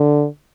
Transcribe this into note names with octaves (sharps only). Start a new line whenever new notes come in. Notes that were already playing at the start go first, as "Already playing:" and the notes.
Already playing: D3